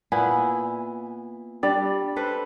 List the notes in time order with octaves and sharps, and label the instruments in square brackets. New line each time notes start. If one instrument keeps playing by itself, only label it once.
[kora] A#2 B3 E4 [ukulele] G#5
[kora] G3 [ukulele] D4 D5
[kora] A4 B4 C5